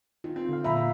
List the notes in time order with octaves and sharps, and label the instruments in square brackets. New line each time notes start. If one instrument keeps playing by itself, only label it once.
[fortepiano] D#3 [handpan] F4
[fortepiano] C4
[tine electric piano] D3 F5
[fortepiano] F2 A#5 B5 [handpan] A#2 E5